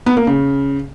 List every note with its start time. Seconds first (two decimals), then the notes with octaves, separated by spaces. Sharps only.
0.06 B3
0.17 A#3
0.27 C#3